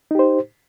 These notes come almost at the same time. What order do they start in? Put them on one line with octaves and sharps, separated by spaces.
D#4 G4 C5